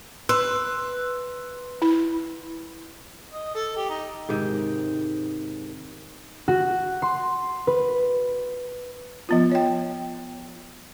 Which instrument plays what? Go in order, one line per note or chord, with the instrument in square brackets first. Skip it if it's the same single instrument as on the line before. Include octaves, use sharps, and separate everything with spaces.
[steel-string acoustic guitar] B4 [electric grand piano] C6 E6
[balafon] E4
[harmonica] D#5
A4
G4
D#4
[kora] G#2 C3 D#3
[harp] F#4
C6
B4
[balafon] F3 B3 F4
C#5 G5